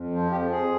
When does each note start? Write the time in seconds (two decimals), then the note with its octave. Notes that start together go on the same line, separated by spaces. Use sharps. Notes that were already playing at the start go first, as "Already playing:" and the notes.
Already playing: F2
0.10 F3
0.30 F2 G4
0.50 F2 G#4